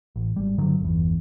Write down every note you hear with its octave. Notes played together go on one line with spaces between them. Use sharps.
A1
G#1 G3
F1 G2 D3 F#3
G1 E2